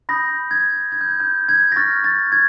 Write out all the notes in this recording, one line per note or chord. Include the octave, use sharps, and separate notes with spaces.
B5 D#6 G6 A#6
G#6
G#6
G6
G#6
G6
G#6
A#6
C#6 F6 A6
A6
G#6